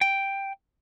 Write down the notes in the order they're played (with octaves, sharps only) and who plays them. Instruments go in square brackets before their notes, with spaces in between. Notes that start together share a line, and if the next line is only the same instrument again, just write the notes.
[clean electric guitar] G5